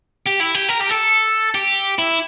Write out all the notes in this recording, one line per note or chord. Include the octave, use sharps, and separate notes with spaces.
G4
E4
G4
A#4
G4
A4
G4
E4